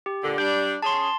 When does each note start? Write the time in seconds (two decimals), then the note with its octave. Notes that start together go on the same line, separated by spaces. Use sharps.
0.06 G4
0.23 A#2 D3
0.38 G3 D4 G6
0.82 C#4 G#4 A5 C6